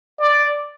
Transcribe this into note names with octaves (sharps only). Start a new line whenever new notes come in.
D5